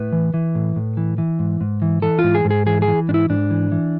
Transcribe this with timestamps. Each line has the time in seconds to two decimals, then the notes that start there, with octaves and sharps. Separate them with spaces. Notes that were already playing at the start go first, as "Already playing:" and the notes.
Already playing: A2 B4
0.12 E3
0.34 E3
0.55 A2
0.76 A2
0.97 E3
1.18 E3
1.39 G#2
1.61 G#2
1.82 E3
2.02 E3 A4
2.19 G#2 F4
2.35 G#4
2.45 G#2
2.51 G#4
2.66 E3 G#4
2.82 G#4
2.88 E3
3.08 G#2 D4
3.14 E4
3.30 G#2 D4
3.51 E3
3.72 E3